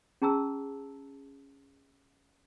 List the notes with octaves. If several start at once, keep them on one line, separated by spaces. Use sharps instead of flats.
C#4 G#4 A5 A#5 E6